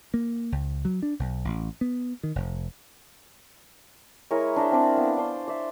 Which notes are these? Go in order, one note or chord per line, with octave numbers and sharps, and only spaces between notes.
A#3
C#2
F#3
D4
B1
A1
B3
D#3
F1
G#3 E4 A#4 C#5
D4 A#4 C5 E5
C4 D4 D5
B3 F5
D4 C5
D5 E5